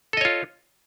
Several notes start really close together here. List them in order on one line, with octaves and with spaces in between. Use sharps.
A4 D#5 C#5 F4